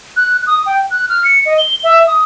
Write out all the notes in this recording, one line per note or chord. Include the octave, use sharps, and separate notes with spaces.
F#6
D#6
G5
F#6
F6
C#7
D#5
G7
E5
D#6